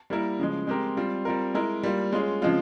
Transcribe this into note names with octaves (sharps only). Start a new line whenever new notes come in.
G3 A#3 E4 A#4
C#3 F3 G#3
G#3 C4 G4 A#4
G3 C4 F4
G3 C4 F4 A#4
G#3 E4 A#4
G3 A#3 F4
G#3 C#4 F4 G#4
C#3 F3 G#3 C4 F4